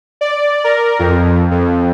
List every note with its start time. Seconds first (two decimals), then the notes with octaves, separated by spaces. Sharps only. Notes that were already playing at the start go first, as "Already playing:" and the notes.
0.21 D5
0.64 A#4
0.99 F2
1.51 F2